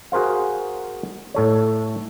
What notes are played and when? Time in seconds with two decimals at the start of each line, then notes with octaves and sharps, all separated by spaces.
0.12 F#4 G#4 A#4 C5 F5
1.34 A2 A4 C#5